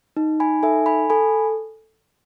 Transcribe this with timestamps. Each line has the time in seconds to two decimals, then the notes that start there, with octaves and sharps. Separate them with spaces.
0.17 D#4
0.40 G#5 B5
0.63 A4 E5 G#5
0.86 G#5 B5
1.10 A4 G#5 B5